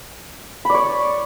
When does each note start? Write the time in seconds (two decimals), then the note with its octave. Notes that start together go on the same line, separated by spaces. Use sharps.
0.65 B5
0.70 D5
0.74 C#5